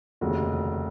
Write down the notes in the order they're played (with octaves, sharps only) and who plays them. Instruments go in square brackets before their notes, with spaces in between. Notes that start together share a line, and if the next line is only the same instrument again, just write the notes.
[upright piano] F1 D#2 C#3 F#4